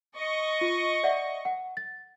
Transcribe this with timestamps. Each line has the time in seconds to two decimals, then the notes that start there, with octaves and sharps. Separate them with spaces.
0.16 D#5 C#6
0.61 F4
1.03 D5 E5 F#5
1.45 F#5
1.77 A6